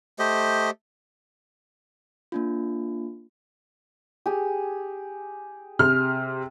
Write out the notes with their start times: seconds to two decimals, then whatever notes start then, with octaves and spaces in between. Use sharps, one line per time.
0.19 A3 G4 C5 D#5
2.32 A#3 D4 F4
4.26 G4 G#4
5.79 C3 F6